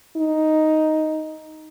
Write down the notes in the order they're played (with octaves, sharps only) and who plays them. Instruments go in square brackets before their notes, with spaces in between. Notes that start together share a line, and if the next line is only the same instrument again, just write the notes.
[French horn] D#4